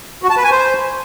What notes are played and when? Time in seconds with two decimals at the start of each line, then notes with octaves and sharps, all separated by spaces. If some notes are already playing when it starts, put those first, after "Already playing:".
0.23 F#4
0.30 A5
0.37 B4
0.44 G#5
0.51 C5